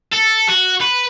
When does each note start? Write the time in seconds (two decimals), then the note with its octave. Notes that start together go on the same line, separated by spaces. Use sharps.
0.12 A4
0.48 F#4
0.81 B4